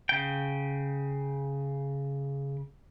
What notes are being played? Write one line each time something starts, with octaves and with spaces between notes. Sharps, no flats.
C#3 G5